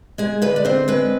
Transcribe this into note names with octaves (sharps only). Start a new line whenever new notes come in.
G#3 G#4
D3 B4
D5
C4 C5
G#3 B4